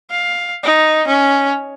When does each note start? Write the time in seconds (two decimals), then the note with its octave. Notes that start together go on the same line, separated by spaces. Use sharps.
0.10 F5
0.63 D#4
1.08 C#4